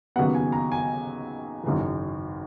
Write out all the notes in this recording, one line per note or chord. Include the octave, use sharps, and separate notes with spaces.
D#2 C#3 F#3 B3 F#5
G#5
A#5
G#5
G#1 F#2 C#3 E3